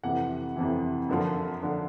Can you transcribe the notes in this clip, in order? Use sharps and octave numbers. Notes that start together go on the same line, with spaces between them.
F2 C3 E3 F#5
F2 C3 E3
F#2 D3 F3
D3 F3